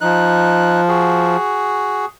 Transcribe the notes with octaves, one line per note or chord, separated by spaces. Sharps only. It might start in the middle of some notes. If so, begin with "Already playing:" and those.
F3 D#4 F#6
F#4 G#4